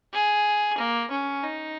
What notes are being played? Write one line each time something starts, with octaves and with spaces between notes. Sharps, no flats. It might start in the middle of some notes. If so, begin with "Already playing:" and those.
G#4
A#3
C#4
D#4